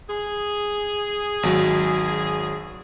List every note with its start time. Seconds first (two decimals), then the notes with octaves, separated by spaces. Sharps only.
0.09 G#4
1.43 G#1 F#3